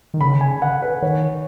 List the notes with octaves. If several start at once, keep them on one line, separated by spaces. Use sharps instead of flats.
D#3
C#3 B5
G#5
F#5
B4
D#3 C#5